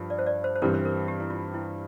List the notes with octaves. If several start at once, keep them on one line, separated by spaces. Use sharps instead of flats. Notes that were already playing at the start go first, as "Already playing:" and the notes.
Already playing: G2 F3
D5
C5
D5
C5
C5
G2 E3 G3 C4 A#4
C5
A#4
G4
E4
F4
E4